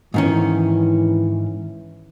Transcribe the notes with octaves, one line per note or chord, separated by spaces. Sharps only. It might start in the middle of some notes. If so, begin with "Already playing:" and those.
G#2 D#3 E3 C#4